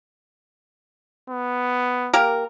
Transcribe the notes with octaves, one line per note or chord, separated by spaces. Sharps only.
B3
A#3 G4 A#4